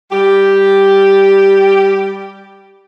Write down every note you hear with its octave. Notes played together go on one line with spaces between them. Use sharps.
G3 G4